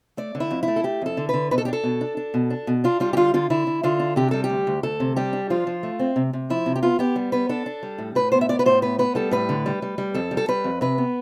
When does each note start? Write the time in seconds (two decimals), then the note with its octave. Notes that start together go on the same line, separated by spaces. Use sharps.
0.17 A3 D5
0.35 D3
0.40 E4
0.51 F2
0.63 E4
0.68 A3
0.76 A4
0.84 A3 G4
1.01 F2 A4
1.17 D3
1.29 D3 B4
1.51 B2 B4
1.58 A4
1.65 G4
1.68 D4
1.73 A4
1.84 B2
2.01 D4
2.17 D4
2.34 B2
2.50 D4
2.67 B2
2.84 D4 F4
3.00 G3 F4
3.13 G4
3.17 D3 F4
3.34 D3 F4
3.50 D3 E4
3.67 D3
3.83 D3 F4
3.99 D4
4.16 C3 G4
4.31 G3 A4
4.44 G4
4.49 D2
4.67 D2
4.83 D2 A4
5.00 C3
5.16 G3 G4
5.33 D4
5.50 F3 F4
5.67 F3
5.83 A3
5.99 C4
6.16 C3
6.33 C3
6.50 F3 E4
6.66 C3
6.76 G4
6.83 B3 F4
6.99 B3 G4
7.16 G3
7.32 B3 B4
7.49 D4 A4
7.66 D4
7.83 G3
7.98 A2
8.15 A2 B4
8.32 B3 C5
8.41 E5
8.49 B3 D5
8.59 B4
8.66 A2 C5
8.82 B3 B4
8.99 B3 B4
9.15 G3 A4
9.31 A2 B4
9.49 D3
9.66 G3
9.82 G3
9.98 G3
10.14 F2 A4
10.31 G3
10.37 A4
10.48 G3 B4
10.64 F2
10.81 C3 B4
10.98 B3